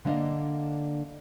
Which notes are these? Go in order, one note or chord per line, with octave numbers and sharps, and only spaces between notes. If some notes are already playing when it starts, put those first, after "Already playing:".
D3 A#3 B3 D4 D#5 F5